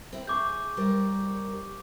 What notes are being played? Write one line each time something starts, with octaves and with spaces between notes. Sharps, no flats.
C4 E4
G#4 C#6 D6 G6
G3 A#4 C5